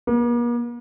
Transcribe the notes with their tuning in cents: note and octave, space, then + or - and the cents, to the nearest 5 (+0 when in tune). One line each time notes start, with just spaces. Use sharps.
A#3 +45